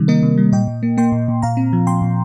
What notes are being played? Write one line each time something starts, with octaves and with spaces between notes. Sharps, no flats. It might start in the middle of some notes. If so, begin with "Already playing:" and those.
Already playing: C3 D#3 G3
A#3 A#4 D#5
C3
G3
A#2 D#5 G5
A#2
A#3
A#3 G5 C6
A#2
A#2
A#2 F5 A#5
C4
F3
A#2 G5 C6
A#2